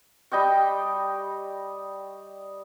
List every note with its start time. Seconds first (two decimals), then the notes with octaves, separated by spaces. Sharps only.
0.32 G3 D#5 G5 C#6